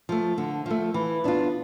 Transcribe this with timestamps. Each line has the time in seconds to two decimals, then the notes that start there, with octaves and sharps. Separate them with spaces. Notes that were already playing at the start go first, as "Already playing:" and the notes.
0.09 F3 A3
0.38 D3
0.66 F3 A3
0.94 E3
1.24 B3 D4 F4